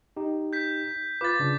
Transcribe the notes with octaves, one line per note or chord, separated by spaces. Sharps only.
D#4 G4
G6 B6
F4 B4 D6 A6
C#3 D4